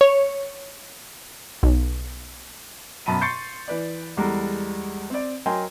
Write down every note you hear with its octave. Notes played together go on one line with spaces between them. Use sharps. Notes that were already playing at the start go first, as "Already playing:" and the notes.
C#5
B1
F#2 B2 A5 B5 D#7
C6 C#6 G6 A6 C7 C#7
E3 B4 D5
E2 G3 G#3 A4 A#5
C4 D5
F#3 A#4 D#5 G5 G#5 C6